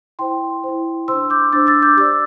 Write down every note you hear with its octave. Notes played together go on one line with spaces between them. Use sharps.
E4 C5 G5 C6
E4 C5
D4 C5 C6 E6
D6 G6
D4 C5 E6 A6
E6 A6
D6 G6
G4 D5 E6 A6